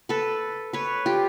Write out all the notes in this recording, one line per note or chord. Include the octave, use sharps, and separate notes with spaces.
A4 B4
B4 C#5
F4 G4